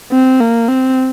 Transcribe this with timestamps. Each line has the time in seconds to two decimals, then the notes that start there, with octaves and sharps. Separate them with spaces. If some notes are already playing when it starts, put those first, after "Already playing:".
0.12 C4
0.41 A#3
0.68 C4